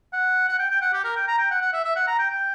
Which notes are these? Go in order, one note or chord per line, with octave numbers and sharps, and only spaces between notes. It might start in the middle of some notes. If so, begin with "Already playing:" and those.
F#5
F#5
G5
G5
F#5
G4
A#4
G5
A#5
G5
F#5
F#5
E5
E5
F#5
A#5
G5
G5